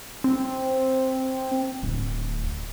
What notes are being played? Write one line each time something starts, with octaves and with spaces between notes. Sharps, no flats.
C4
D1